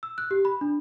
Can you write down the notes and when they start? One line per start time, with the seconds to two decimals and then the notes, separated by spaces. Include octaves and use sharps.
0.03 E6
0.18 F#6
0.31 G4
0.45 B5
0.61 D4